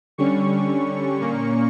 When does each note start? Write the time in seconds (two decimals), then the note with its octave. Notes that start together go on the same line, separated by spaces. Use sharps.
0.18 D3 G3 C#4 C#6
1.19 A#2 A#3 C#4